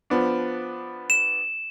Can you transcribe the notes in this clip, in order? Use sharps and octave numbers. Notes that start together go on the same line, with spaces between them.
F3 B3 D4
E7